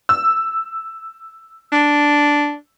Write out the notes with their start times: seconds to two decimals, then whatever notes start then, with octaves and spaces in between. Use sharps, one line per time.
0.09 E6
1.72 D4